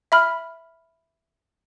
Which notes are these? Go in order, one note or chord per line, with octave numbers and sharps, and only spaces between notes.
E5 B5 F6